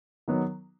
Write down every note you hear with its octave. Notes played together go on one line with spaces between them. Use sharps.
D#3 F#3 B3 D#4